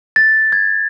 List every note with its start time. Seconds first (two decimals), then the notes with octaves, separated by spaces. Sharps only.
0.16 A6
0.52 G#6